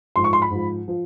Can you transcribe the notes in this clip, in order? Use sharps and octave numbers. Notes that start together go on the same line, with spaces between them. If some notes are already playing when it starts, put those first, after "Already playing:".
G#2 F3 C6
C#6
C6
B5
G#2 F3
F3